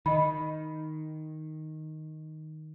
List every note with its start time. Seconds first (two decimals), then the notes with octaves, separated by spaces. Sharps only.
0.06 D#3 D#5 B5